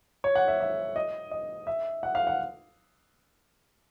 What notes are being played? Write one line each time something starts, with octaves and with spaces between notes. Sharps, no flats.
C#5
F#5
E5
E5
D#5
D#5
E5
F#5
F5
F#5